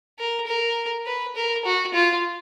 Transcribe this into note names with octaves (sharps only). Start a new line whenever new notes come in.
A#4
A#4
B4
A#4
F#4
F4